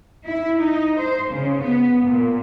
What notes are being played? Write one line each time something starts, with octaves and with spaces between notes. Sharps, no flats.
E4
D#4
C5
C#3
B3
A#2